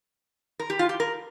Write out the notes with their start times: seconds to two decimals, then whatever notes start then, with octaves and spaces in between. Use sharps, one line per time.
0.60 A#4
0.70 G4
0.79 F4
0.89 G4
1.00 A#4